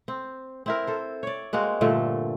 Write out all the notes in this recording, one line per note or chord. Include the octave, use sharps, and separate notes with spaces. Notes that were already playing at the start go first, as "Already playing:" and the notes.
C4
C4 E4 A#4
A4 C5
C#5 D5
G#3 A#3 C4 F#4
G2 A#2 D3 A3